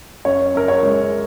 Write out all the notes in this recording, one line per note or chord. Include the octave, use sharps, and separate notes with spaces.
F#2 C#5
F#2 A#4
C#5
G#3